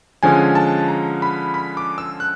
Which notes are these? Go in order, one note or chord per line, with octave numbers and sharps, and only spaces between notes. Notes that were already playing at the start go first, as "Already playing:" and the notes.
D3 F3 G#3 C#4 G#5
A5
A#5
B5
B5
D6
E6
F#6